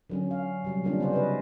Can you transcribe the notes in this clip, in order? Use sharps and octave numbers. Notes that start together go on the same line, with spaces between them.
D3 F#3 C#4
F5
C3 F#3 G3
D3 G3 A#3 C#4 D4 F4
C#3 B3 E4 C5 D5
F#4 B4 D#5